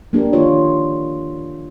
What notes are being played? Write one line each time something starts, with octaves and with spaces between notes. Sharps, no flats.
A#3 D4 G4 A#4
D#3 F4 C#5